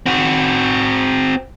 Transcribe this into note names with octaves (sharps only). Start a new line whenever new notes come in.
C4 F#4